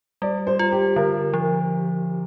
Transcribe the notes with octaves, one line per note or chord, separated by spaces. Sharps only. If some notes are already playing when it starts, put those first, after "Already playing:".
G3 D5
C5
F4
G4
D3 A#4
F3